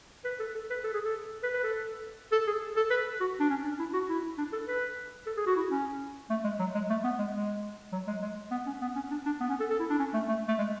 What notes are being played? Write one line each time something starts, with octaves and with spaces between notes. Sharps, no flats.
B4
A4
A4
B4
A4
G#4
A4
B4
B4
A4
A4
G#4
A4
B4
F#4
D4
C#4
D4
E4
F#4
E4
D4
A4
B4
A4
G#4
F#4
E4
C#4
A3
G#3
F#3
G#3
A3
B3
G#3
G#3
F#3
G#3
G#3
B3
C#4
B3
C#4
D4
D4
B3
C#4
A4
A4
E4
D4
C#4
A3
A3
A3
G#3